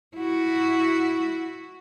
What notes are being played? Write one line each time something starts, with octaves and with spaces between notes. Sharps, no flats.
E4 F#4